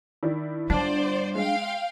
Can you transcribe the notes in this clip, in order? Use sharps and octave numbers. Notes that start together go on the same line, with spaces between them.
D#3 D4 E4
G1 G3 D4 C5 D5
G#3 F5 G5